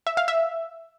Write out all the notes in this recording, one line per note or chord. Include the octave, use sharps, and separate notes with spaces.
E5
F5
E5